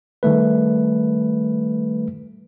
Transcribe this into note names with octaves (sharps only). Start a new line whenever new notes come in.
D#3 G3 A3 B4